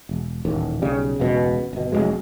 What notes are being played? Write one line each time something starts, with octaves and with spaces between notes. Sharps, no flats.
E1
D#1 A1 D#2
B1 C#3 G3
E1 C#2 B2
G1 B2
F1 D2 F#3 G#3